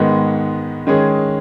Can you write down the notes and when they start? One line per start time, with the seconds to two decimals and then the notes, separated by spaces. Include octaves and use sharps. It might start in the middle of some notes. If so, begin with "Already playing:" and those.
Already playing: G#2 D#3 G#3 B3
0.87 D#3 G#3 C#4 G#4